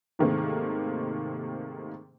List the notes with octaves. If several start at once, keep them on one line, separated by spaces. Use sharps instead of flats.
G#2 C3 D#3 A3 A#3 C4